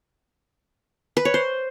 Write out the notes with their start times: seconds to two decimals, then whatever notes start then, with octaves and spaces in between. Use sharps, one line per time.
1.17 B4
1.25 C#5
1.34 C5